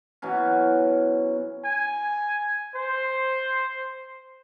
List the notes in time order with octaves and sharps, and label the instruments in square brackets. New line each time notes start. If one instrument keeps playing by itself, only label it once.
[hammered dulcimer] B2 E3 F#3 C#4
[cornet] G#5
C5